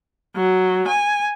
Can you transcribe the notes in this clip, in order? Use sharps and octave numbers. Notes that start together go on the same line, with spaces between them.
F#3
G#5